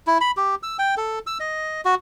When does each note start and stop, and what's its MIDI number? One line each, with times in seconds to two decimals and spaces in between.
0.07 0.18 64
0.21 0.31 83
0.37 0.55 67
0.63 0.77 88
0.79 0.95 79
0.97 1.19 69
1.27 1.38 88
1.40 1.81 75
1.85 1.95 66